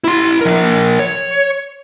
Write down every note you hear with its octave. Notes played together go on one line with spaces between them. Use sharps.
E4 C6
F3 A#4
C#5